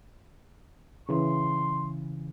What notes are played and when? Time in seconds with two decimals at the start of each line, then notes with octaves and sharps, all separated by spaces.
1.09 C#3 E3 C6